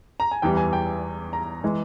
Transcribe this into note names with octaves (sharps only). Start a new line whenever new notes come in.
A#5
G#5
E2 E3 G3 G5
G#5
G5
A#5
E3 G#3